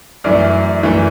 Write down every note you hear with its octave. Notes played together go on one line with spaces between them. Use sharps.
F#2 E3 A3 D5
F#2 E3 A3